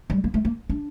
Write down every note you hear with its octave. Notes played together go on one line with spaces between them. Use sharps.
G3
A#3
A3
A#3
D4